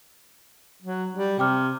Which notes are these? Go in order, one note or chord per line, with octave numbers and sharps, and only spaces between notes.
F#3
G3
C3 G5 D6 F6